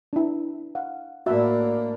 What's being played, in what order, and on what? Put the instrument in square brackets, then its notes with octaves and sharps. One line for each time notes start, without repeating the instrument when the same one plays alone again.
[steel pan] D4 E4
F5 F#5
[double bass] A2 A#3 [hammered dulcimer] D4 E4 D5 [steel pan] F#4 E5